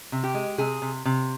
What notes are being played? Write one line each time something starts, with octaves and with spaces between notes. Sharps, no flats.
C3
G4
G#3
C3 G#4
C3
C3